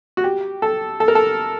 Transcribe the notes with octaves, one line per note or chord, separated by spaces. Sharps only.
F#4
G4
A4
A4
A#4
A4